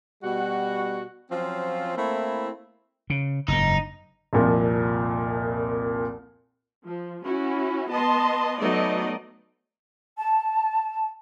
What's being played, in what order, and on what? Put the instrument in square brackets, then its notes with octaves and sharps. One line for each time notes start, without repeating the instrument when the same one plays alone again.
[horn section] B2 G3 F#4
F3 F#3 C4 C#4 F4
A3 A#3 C4 E4
[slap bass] C#3
[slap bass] F#1 G#2 [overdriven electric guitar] D#4
[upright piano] C2 F2 A#2 F3
[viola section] F3
C#4 E4 F#4
B3 D#5 A5 C6
F#3 A3 B3 D#4 D5 D#5
[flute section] A5